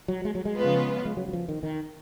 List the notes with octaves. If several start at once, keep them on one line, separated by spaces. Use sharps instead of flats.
F#3
G#3
F#3
G#3
C#3 F3 B3 F4 B4
G#3
F#3
F#3
F3
D#3
D#3